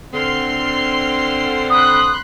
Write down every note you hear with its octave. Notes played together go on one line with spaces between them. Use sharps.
D3 C4 C6 F6 C7
B5 C6 D#6 F#6